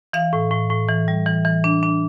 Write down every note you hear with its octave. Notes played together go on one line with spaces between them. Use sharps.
E3 F5
A2
A2
A2
E3
G3
E3
E3
D4
D4